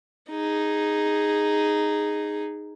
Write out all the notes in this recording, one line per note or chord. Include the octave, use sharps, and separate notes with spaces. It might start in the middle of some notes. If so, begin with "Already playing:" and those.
D#4 G#4